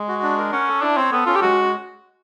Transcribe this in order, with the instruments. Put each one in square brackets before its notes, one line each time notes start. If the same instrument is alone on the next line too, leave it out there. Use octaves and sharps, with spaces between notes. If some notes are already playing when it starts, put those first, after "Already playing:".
Already playing: [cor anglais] G#3
[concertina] F#4
D4
A#4
[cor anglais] C#4 [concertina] F#5
[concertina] A4
[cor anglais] D4 [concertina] E4
[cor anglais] C4 [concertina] C#5
[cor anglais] B3 [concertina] A4
[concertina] C#4 [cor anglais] F4
[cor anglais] G4
[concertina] G#3 [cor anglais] F#4